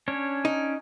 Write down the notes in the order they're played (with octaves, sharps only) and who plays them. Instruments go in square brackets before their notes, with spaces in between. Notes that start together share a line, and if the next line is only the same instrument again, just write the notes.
[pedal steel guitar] C#4 D4 C#5
[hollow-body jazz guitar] D#4